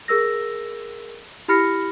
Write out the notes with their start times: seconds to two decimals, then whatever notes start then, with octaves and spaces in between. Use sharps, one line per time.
0.08 G#4 A#4 E6 A#6
1.48 E4 G4 B5 F6 A#6 C#7